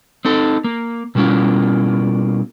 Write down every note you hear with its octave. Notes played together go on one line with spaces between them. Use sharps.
C4 D#4 A4
A#3
B2 G3 A#3 C#4 E4 F4